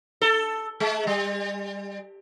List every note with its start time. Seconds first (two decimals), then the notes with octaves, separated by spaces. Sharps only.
0.21 A4
0.80 G#3
1.07 G3